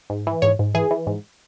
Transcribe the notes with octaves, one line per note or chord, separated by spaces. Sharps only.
G#2
E3
G#2 C#5
G#2
E3 G#4
E3
G#2